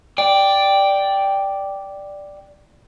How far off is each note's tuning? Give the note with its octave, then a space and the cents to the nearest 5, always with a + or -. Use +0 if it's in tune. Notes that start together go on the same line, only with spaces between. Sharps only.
D5 +0 G5 +0